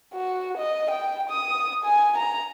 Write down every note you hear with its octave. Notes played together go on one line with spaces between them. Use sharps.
F#4
D#5
G5
D#6
G#5
A#5